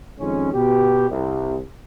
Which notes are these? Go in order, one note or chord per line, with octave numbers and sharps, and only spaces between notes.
F2 D#3 G#3 C#4
B2 G4
C2